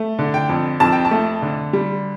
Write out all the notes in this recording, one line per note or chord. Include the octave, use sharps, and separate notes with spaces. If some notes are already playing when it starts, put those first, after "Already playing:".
Already playing: A3
D3
G5
F2
F2 A5
G5
A5
A3
D3
G3